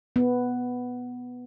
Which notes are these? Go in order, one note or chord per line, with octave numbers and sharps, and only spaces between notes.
B3